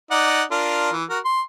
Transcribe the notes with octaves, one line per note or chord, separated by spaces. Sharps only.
D#4 D5 F#5
D4 F4 A#4
E3
F#4 A#4
C6